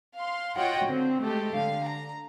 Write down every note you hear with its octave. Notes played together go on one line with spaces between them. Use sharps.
F5 C6
F4 F#4 C#5 D#5 F#5 G5
D3 C4
G#3 A3 G4 A4
D3 F5
A#5